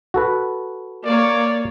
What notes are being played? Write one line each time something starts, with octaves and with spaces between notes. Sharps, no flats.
F#4 A4 B4
A#3 C#5 D5